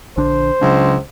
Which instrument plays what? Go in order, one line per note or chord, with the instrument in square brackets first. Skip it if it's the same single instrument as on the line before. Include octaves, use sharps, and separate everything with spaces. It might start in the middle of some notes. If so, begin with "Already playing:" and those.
[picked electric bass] A#1 D3 D4 [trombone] C5
[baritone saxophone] C#2 [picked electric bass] C#3 F#3 D4